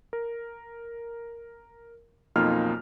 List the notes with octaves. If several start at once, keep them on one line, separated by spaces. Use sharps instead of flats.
A#4
B1 F2 A#3 D#4 F4 F6